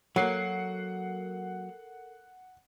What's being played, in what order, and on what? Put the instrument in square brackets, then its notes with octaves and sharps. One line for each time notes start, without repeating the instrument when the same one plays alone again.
[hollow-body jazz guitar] F#3 A#3 [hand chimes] A4 A#4 [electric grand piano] F#5 C7